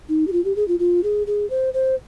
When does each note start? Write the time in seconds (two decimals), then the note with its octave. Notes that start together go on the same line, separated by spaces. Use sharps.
0.09 D#4
0.27 G4
0.32 F4
0.45 G4
0.56 G#4
0.68 F4
0.79 F4
1.04 G#4
1.27 G#4
1.50 C5
1.74 C5